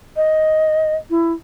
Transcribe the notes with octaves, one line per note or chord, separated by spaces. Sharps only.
D#5
E4